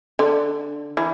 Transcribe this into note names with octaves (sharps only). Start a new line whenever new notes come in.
D3
E3